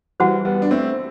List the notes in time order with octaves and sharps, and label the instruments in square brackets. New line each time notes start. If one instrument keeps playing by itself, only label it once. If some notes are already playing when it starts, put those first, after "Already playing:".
[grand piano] E3 G3 [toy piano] F#4 C5 F#5 A5
[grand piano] G3 B3
D4
A3 C4